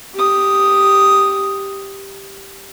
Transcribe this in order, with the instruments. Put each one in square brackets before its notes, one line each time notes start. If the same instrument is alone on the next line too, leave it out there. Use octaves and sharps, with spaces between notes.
[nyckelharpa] G4 D#6